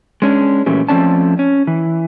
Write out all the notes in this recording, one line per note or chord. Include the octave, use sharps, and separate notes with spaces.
G#3 C#4 D4
A#2 E3 F#3 A3 C#4 G4
F3 A3 C4 C#4 D5 A5
C#4
E3